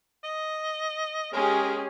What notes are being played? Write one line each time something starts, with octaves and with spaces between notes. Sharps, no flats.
D#5
G#3 C#4 G4 G#4 A#4